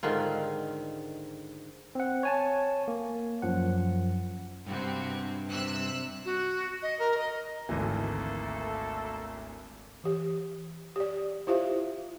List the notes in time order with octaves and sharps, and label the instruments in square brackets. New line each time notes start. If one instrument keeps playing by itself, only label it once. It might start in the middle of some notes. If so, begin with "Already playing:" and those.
[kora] G#2 D3 D#3 F4
[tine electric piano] C4 F#5
C#5 G#5 A5
A#3
F#2 F3 F#5
[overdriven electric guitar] G2 [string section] C3 C4 F#4
[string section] C3 E6 F#6
[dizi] F#4
D#5
A#4
D#5
[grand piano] G#1 D2 E3 [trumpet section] A3 A#3 A4
[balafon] E3 G4
G4 D5
E4 F4 G4 C5 E5 F5